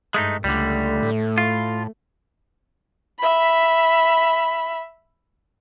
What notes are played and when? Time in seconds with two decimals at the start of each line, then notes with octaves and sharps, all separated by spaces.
0.14 G2 G#3 A3 D#4
0.44 C#2 D3 G3 A3
1.03 A2
1.38 F4
3.19 E5 B5